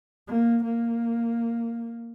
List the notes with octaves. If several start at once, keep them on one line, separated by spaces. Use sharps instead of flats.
A#3
A#3